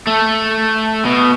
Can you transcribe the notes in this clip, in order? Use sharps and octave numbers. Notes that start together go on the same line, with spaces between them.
A3
B2